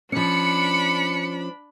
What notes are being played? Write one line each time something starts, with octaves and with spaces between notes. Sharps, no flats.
F3 C#4 D4 B5 C#7